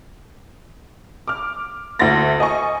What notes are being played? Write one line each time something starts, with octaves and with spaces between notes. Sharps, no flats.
D6 F6
D2 E4 E5 C6 A6 A#6
D#5 G#5 C#6